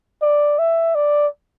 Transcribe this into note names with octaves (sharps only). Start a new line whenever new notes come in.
D5
E5
D5